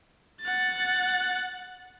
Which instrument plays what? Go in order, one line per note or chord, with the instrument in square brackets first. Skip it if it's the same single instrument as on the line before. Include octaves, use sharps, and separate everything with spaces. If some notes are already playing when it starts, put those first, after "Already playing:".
[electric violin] F#5 A6